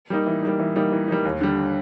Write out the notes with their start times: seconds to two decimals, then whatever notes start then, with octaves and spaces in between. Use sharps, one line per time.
0.10 G3 A#3 D#4
0.27 E3
0.43 G3 A#3 D#4
0.59 E3
0.76 G3 A#3 D#4
0.92 E3
1.08 G3 A#3 D#4
1.25 D#2
1.41 D3 G3